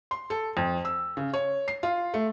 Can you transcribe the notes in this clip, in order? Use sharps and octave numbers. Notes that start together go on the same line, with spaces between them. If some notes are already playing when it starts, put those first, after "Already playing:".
C6
A4
F2
E6
C#3
C#5
C7
F4
A3